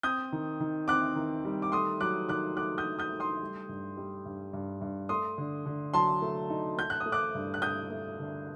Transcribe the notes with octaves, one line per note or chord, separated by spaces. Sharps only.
C4 D#6 G6
D#3
D#3
C4 D6 F#6
D#3
G3
D6
A3 C6 D#6
F#3 D6 F#6
D#3 D6 F#6
A3 D6 F#6
D#6 G6
F#3
D#6 G6
A3
C6 D#6
G3
G2
G3
G2
G2
G2
A3 C6 D#6
D3
D3
F#3 A5 C6
A3
D#4
A3 G6
F#6
D#6
A3
D6 F#6
G2
F#6
A3 D#6 G6
A3
D3